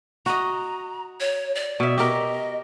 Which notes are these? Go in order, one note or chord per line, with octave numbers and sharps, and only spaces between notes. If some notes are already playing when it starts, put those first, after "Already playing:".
F#4 D#5 A#5
C#5
D5
B2 E5
G4 A#4 D#5